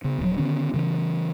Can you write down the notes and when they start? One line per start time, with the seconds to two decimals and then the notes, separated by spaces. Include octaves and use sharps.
0.04 C#3 B3
0.19 D#1 D2 F3 F#3
0.38 D3 D#3 B3 C#4
0.74 C#3 E3 F#3 C#4